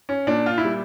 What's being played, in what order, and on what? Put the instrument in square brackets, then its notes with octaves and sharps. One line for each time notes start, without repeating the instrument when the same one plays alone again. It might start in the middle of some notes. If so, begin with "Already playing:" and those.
[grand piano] C#4
A#2 D4
F4
E4
G3